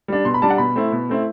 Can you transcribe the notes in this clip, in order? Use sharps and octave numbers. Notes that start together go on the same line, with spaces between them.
G3 D4
B2 C6
B5
G3 D4 A5
F#5
B2 B5
A3 C4 E4
B2
A3 C4 E4